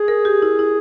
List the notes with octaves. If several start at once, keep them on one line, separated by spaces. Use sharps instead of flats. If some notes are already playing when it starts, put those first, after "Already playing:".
Already playing: G#4
A#4
G4
E4
E4